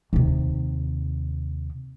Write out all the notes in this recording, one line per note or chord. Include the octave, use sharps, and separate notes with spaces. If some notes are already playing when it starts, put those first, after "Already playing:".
D#2 C3